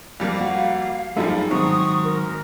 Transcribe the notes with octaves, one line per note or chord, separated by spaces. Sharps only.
F2 G3 A#3 F5
F#4
F#2 F3 G3 A3 D#4 G#4
G#2 D#3 F#3 C4 C#6 D#6
A#4